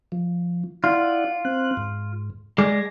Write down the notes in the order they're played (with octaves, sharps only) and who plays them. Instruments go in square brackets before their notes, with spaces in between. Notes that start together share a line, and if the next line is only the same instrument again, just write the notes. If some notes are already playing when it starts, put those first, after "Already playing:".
[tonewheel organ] F3
[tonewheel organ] E4 D5 F#5 [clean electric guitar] F4
[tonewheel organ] C4 F#6
G#2
[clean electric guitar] G#3 D5 [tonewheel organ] G#5 A#6